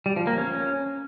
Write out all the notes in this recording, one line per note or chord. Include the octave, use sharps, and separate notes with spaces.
G3
F3
A#3
C#4